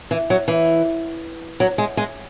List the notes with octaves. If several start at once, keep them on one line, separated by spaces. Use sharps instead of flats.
E3
F#3
E3
F#3
G#3
G#3